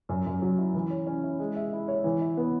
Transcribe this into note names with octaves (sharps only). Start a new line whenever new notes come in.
F#2
F#2
F#3
E4
E3
C#5
C#4
E4
G#3
E5
E4
C#5
E3
E5
B3